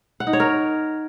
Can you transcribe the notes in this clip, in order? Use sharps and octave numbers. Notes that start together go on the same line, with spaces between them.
F#5
D#4
C#5
A#4